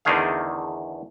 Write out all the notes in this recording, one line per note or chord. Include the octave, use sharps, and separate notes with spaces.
E2 D3 D#3 A3 G#4 F5